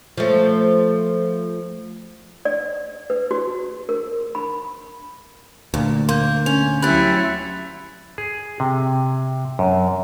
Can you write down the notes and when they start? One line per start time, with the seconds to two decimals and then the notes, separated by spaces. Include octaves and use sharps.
0.18 F3 A3
2.45 D5
3.10 B4
3.31 F#4
3.89 A#4
4.35 B5
5.74 D2 A#2
6.09 A#3 C6 G6
6.46 C#4 F7
6.82 F#3 C#4 E4 G4 B5 F#6 A6
8.18 G#4
8.60 C3
9.59 F#2